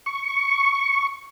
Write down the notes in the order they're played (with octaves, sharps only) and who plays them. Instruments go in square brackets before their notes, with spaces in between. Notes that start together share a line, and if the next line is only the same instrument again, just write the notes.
[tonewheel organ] C#6